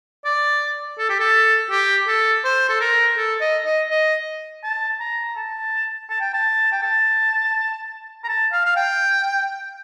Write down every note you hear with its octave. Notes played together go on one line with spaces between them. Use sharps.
D5
A4
G4
A4
G4
A4
C5
A4
A#4
A4
D#5
D#5
D#5
A5
A#5
A5
A5
G5
A5
G5
A5
A#5
A5
F5
F5
G5